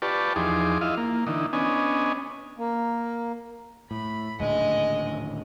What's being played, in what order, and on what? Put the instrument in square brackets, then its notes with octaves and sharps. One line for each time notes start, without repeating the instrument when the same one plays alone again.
[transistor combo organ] F4 G4 B4 D5 A5 C#6
E2 F3 D#4 G#4 C6 D6
E4 F4 D#5 F5
A#3
D3 E3 D#4
B3 C#4 D4 D#5 G#5
[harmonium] A#3
[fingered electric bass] A2 [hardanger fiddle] B5
[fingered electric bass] D#1 A2 D3 [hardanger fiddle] G#3 D#5